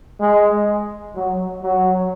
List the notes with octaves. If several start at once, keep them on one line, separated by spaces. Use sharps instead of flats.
G#3
F#3
F#3